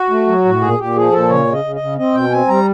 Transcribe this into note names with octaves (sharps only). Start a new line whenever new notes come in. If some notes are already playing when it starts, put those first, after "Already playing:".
Already playing: F#4
A3
F#3
A2
A#2 G#4
A#2 G4
F3 G#4
A#2 A4
C#3 C#5
C#3
D#5
C#3
D#5
C#3
C4 D#5
B2 G5
C4 G#5
G3 A#5